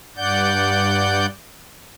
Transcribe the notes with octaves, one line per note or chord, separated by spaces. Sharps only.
G2 D5 F#5 G6